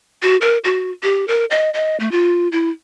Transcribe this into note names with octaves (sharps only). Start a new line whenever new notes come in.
F#4
A#4
F#4
G4
A#4
D#5
D#5
A3
F4
E4